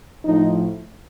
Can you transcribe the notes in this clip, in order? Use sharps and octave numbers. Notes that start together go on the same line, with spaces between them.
A2 F3 D#4